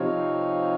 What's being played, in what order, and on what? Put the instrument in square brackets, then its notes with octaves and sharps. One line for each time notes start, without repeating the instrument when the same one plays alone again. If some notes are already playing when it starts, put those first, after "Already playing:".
Already playing: [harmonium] C3 F3 C4 D#4 C#5 F5